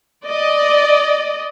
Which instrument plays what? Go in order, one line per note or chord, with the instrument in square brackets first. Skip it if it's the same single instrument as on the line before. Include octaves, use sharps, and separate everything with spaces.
[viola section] D5 D#5